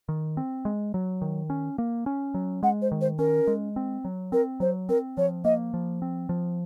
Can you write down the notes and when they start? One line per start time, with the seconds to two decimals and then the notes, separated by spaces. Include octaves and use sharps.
0.09 D#3
0.37 C4
0.65 G#3
0.94 F#3
1.22 D#3
1.50 C#4
1.78 A#3
2.06 C#4
2.34 F#3
2.63 G#3 F#5
2.82 C5
2.92 D#3
3.01 C5
3.19 C#4 A#4
3.47 G#3
3.76 C4
4.05 F#3
4.32 C4 A#4
4.60 F#3 C5
4.89 C4 A#4
5.17 F3 C#5
5.45 A#3 D#5
5.74 F3
6.02 C4
6.29 F3